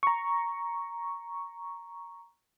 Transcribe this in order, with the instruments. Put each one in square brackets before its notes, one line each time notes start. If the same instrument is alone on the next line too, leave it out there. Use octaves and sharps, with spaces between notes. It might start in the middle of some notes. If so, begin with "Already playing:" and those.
[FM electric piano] A#5 C#6